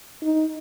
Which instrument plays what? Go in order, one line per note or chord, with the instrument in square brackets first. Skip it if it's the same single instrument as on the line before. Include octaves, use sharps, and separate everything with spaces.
[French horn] D#4